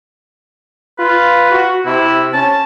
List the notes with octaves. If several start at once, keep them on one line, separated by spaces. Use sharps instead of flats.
F4 B4
F#4
C3 E4
C#4 A5